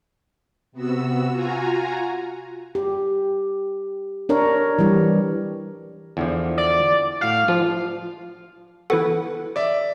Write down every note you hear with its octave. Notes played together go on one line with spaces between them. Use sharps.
C3 B3 F#4 E6
F4 F#4 G#5 A#5
G4
D4 A#4 C#5
E3 G3
E2 D3 F3
D5
A2 F#4 F5
F3 F4
E3 B3 F#4 A4
D5 E5